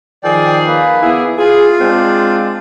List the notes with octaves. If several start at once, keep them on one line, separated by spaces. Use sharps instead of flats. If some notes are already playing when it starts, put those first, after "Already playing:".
D#3 F3 G#4 D5 G5
A#3 B4
B3 E4 G#4
F4 G#4
G#3 C4 D4